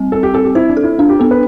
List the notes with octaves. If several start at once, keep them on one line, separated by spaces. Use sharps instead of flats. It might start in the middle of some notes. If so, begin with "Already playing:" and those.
Already playing: G3 C4
C4 A4
G4
C4 A4
G4
E4 C5
D4
A4
E4
D4 F4
G4
B3 A4
B4